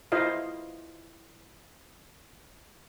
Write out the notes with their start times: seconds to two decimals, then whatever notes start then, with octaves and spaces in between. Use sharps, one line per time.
0.12 E4 F4 C5 D#5 F5